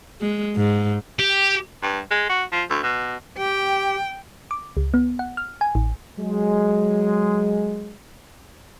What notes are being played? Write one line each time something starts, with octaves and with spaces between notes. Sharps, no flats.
G#3
G#2
G4
G2
G#3
F#4
F3
D2
B2
G4 G5
D6
C#2
B3
F#5
F6
G#5
A1
F#3 G#3